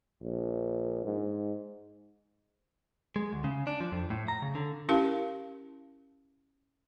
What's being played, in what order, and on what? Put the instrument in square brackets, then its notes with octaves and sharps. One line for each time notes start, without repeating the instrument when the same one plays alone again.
[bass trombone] A#1
G#2
[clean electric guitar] G#3
D2
C#3
D4
F3
F2
A2
A#5
C#3
D3
[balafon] C#4 E4 G4 A#4 F5